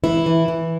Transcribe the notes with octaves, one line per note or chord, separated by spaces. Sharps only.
E3 E4
E3
E3